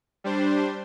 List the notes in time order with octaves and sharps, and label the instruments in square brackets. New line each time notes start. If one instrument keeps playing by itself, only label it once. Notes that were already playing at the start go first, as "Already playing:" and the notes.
[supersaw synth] G3 D4 C5